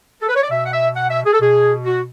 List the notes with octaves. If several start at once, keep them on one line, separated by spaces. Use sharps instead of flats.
A4
B4
C#5
D5
B2 E5
F#5
E5
F#5
E5
G#4
A4
B2 G#4
F#4